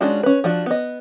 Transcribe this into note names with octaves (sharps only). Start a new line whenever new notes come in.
G#3 C#4 D4 F4 F#4
C#4 B4
F3 D4 F#4
B3 D#5